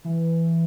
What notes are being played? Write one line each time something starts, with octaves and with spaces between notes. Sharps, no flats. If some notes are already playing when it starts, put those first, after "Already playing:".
E3